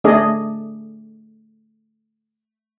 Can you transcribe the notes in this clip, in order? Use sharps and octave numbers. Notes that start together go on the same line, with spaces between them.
A3 D4 G#4 D5 D#5